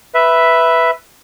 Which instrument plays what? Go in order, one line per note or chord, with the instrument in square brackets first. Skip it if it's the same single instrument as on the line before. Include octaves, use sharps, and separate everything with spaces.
[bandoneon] B4 E5